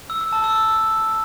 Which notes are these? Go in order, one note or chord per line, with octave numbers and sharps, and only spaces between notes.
E6
E6
A5
E6